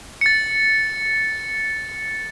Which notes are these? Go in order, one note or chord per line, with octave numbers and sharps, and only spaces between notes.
A6 C#7